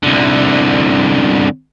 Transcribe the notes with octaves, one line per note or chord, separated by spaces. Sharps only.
C2 D3